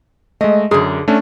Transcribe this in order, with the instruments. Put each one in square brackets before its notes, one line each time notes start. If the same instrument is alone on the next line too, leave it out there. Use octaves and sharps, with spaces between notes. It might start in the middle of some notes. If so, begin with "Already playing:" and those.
[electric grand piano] G#3 A3 [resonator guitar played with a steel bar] D#5
[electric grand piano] F#2 [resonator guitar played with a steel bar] D3 G#4
[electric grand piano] A3 C#4 D4